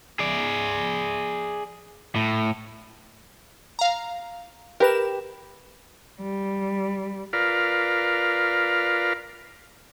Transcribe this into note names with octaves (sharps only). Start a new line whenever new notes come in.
G#4 D5
A2
F5 A#5
G4 A#4 B4 E7
G3
F4 A#4 B4 D5 F5